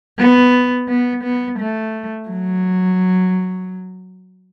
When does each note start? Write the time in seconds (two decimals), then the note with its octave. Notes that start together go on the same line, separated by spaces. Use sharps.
0.19 B3
0.88 B3
1.23 B3
1.58 A3
2.28 F#3